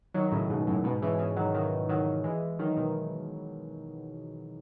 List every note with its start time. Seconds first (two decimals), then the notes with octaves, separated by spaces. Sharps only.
0.14 D#3 F#3
0.32 A2 C#3
0.50 G#2 B2
0.67 F#2 A2
0.84 G#2 B2
1.02 C#3 E3
1.19 C#3 E3
1.36 D#3 F#3
1.54 D#3 F#3
1.89 D#3 F#3
2.24 E3 G#3
2.59 D#3 F#3
2.77 B2 D#3